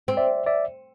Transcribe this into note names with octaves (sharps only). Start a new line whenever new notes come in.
C4
D5 E5
D5 E5